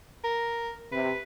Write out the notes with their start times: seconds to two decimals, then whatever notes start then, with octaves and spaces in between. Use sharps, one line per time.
0.24 A#4
0.92 C3 B4